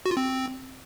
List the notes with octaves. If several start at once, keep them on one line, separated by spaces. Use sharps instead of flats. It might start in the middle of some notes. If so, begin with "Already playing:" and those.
F#4
F4
C4